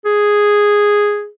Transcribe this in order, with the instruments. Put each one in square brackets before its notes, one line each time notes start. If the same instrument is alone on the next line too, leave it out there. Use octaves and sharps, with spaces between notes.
[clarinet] G#4